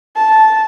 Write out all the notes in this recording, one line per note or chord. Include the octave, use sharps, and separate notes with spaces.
A5